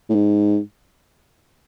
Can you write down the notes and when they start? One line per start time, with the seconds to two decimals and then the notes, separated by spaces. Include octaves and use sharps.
0.10 A2
0.15 G#2